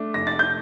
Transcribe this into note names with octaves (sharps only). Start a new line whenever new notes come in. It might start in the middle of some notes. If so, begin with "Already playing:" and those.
Already playing: A3 D4
F1 A#6
A6
G6